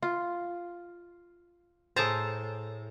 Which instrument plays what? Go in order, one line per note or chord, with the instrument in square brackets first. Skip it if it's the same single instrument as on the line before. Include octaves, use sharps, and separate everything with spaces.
[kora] F4
[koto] A2 A5 A#5 [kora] G#4 C5